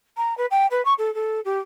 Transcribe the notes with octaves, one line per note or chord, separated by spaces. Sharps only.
A#5
B4
G5
B4
C#6
A4
A4
G4